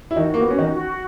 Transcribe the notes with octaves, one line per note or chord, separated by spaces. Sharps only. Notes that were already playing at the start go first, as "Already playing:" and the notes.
E4
D#3 D#4 F#4
A#3
B3
F#4
C#4
D#3 D#4
F#4